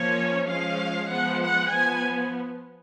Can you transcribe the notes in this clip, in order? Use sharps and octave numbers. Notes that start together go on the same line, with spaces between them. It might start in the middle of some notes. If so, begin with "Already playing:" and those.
Already playing: F3 A#3 C#4 C#5
F3 G#3 C#4 F5
F3 G#3 B3 F#5
F#5
F3 B3 G#5